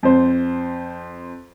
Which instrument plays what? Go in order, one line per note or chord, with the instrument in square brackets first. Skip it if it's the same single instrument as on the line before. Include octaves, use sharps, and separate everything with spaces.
[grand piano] F2 C5